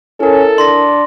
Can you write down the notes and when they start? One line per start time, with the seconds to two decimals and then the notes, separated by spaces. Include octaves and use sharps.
0.20 C#4 E4 A4 A#4
0.58 D4 C6 A#6